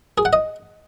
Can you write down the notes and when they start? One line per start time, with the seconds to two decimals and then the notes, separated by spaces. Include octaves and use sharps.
0.18 G#4
0.25 F#5
0.33 D#5